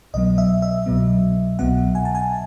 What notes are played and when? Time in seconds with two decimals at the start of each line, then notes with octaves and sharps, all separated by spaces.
0.14 C2 B2 F#3 B3 D#5
0.38 E5
0.62 E5
0.86 C2 B2 F#3 B3
1.59 C2 B2 F#3 B3 F#5
1.95 G#5
2.05 A5
2.15 G#5